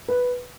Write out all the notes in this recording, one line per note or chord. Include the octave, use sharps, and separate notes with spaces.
B4